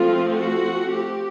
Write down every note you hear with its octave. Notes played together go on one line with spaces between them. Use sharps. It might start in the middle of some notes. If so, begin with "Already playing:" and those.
Already playing: F3 A3 C4 F4
F#4
G4